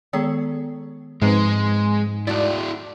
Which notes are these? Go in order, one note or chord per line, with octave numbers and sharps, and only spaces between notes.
D#3 G#3 B3 G#4 A4 C#5
G#2 F3 G#3 C4 B4
A3 E4 F#4 D5 A6